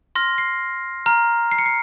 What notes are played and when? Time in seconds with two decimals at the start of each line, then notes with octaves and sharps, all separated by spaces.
0.15 C6 F6 A#6
0.38 C7
1.06 A#5 F6
1.52 C7
1.59 C#7
1.66 C7